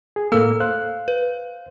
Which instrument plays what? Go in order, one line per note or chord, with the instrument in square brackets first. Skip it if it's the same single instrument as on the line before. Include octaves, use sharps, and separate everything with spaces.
[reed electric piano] G#4
[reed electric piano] A2 A#3 [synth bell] A4 E6
[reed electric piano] C5 F5 F#6
[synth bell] B4